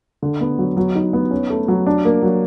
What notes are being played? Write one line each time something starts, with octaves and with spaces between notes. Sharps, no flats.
D3
B3
F#3
F#3
D#4
B3
C#4
A3
F#3
D4
A#3
F#3